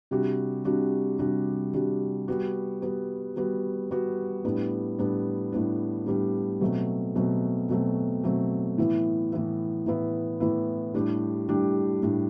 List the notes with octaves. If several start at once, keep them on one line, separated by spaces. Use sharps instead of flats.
C3 G3 D4 F#4
C3 G3 D4 F#4
C3 G3 D4 F#4
C3 G3 D4 F#4
G3 B3 F#4
G3 B3 F#4
G3 B3 F#4
G3 B3 F#4
A2 G3 B3 D4
A2 G3 B3 D4
A2 G3 B3 D4
A2 G3 B3 D4
B2 F#3 A3 C4
B2 F#3 A3 C4
B2 F#3 A3 C4
B2 F#3 A3 C4
A2 E3 B3 E4
A2 E3 B3 E4
A2 E3 B3 E4
A2 E3 B3 E4
A2 G3 D4 G4
A2 G3 D4 G4
A2 G3 D4 G4